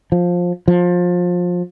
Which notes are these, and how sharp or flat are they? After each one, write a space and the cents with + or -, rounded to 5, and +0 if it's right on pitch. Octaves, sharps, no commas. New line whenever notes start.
F3 +15
F3 +25